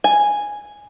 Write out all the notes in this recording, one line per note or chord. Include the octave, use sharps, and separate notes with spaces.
G#5